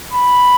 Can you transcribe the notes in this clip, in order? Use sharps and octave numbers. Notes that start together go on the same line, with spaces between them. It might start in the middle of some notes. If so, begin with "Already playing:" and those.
B5